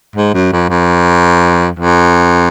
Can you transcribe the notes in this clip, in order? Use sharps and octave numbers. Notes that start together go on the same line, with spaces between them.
G#2
F#2
F2
F2
F2